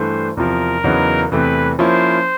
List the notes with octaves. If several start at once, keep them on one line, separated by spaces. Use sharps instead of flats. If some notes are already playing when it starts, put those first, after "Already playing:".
Already playing: G2 E3 A3 D4 C5
E2 C3 F3 A#4
E2 C#3 F#3 B3 D#4
E2 C3 E3 A3 B4
F3 A#3 C#4 E4 C5